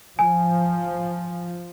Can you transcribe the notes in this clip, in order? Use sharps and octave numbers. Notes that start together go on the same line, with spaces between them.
F3 G#5